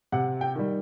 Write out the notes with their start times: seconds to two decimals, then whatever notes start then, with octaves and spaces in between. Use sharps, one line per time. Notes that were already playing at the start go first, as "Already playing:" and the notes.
0.12 C3 F#5
0.41 G5
0.55 D#3 G3